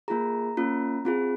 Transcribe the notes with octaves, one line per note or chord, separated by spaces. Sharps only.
A#3 F4 G#4 A#5
A#3 C#4 F4
C4 F4 G#4